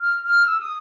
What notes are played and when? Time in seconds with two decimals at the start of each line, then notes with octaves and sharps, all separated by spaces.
0.01 F6
0.25 F6
0.46 E6
0.61 D#6